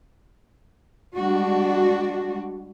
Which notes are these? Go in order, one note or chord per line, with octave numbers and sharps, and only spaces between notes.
G3 G#3 D4 F#4